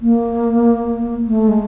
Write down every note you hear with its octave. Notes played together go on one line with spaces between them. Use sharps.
A#3
A3
G#3